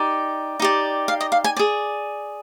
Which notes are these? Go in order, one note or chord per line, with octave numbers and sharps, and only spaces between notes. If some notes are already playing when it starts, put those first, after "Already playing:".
Already playing: D#4 G4 D5
D#4 G4 D5
F5
D#5
F5
G#5
G#4 D5 G#5